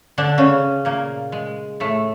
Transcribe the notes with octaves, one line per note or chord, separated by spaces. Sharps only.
D3 D4
C#3 C#4
A#2 A#3
G#3
A2 A3